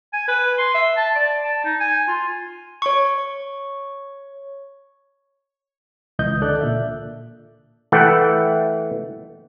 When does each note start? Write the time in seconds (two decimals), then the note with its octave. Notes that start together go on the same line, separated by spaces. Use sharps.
0.13 G#5
0.28 B4
0.58 C6
0.74 E5
0.96 A5
1.16 D5
1.44 A5
1.64 D#4
1.80 G#5
2.08 F4
2.82 C#5 C#6
6.19 C#2 E3 D#5 G6
6.42 D3 A4 D5 F#6
6.61 A#2 E5
7.92 E3 A3 F#5 G5